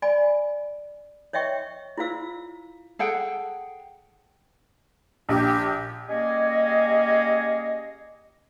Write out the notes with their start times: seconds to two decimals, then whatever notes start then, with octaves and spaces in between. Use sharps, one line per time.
0.02 D5 G#5 B5
1.33 C#5 D#5 E5 G5 C#6
1.98 E4 F4 C5 F5 E6
2.99 G#4 A4 F#5 G5
5.29 A#1 G4
6.08 G3 A#3 C#4 G#4 D#5